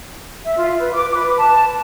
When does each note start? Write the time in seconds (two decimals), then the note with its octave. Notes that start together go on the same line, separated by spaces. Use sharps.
0.45 E5
0.58 F4
0.80 B4
0.93 D6
1.15 B4
1.37 A5